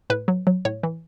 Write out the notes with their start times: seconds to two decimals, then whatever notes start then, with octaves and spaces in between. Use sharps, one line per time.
0.10 A2 B4
0.28 F#3
0.47 F#3
0.65 A2 C#5
0.83 E3